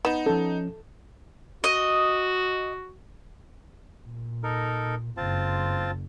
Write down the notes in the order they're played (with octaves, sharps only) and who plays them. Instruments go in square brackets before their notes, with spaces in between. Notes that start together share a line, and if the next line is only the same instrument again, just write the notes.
[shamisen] B3 [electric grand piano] D#4 E7
[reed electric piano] F3 C#4 [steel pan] A4
[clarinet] F#4 [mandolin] D#5
[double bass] A#2
[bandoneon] D#4 A4 A#4
[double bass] F#1 [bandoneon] C4 F4 A5